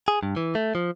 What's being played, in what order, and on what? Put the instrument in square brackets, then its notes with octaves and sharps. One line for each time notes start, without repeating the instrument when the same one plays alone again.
[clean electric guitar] G#4
G2
E3
A3
F3